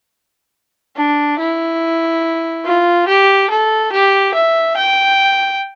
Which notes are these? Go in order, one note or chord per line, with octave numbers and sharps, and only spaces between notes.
D4
E4
F4
G4
A4
G4
E5
G5